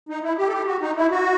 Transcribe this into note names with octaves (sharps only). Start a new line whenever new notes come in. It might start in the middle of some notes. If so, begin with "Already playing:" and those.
D#4
E4
G4
A4
G4
F#4
D#4
E4
F#4